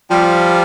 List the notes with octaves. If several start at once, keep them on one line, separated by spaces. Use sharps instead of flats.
F3 G3